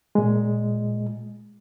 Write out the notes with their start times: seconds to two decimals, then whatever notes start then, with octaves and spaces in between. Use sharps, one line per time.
0.15 A#2 G#3